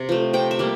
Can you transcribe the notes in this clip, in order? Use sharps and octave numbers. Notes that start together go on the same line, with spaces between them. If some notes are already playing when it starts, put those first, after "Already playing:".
Already playing: C3
F3 A3
C3 G5
E5
G3 A#3